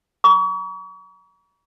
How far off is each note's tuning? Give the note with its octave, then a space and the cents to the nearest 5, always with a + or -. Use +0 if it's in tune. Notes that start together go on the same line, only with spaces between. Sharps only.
A#5 +35 C#6 +40